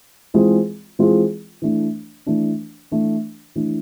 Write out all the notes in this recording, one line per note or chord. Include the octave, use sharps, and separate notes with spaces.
E3 G#3 C4 F4 G#4
E3 G#3 C4 F4 G#4
E3 A3 D4
E3 A3 D4
E3 A3 D4
E3 A3 D4